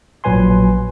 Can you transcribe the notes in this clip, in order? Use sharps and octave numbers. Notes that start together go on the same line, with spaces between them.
A#1 A#2 F#3 B4 G#5 C6